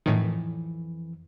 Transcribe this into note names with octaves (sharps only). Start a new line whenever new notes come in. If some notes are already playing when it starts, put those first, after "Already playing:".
F2 A2 D#3 E3